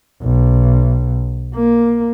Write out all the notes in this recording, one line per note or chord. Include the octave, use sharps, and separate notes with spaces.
B1
A#3